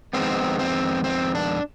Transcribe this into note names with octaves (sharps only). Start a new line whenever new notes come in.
F2 D#3 G#3 B3 C4
C4
C4
D4